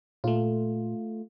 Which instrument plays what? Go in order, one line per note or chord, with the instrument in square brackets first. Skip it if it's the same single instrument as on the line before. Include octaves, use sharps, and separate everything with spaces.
[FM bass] A#2 [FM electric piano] A3 F4